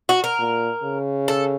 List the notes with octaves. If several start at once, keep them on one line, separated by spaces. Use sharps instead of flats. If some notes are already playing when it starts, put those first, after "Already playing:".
F#4
A#4
A#2
C#3
A4